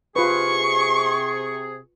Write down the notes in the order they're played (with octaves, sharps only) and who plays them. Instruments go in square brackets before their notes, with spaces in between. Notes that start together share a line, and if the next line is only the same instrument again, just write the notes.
[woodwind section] C3 G#4 [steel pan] F4 B4 [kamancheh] C#6